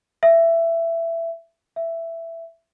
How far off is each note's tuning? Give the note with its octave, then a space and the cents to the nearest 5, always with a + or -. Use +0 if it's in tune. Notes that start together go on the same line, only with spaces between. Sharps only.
E5 +15
E5 +10